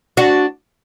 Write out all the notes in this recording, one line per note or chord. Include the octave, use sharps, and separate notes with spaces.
D4 F#4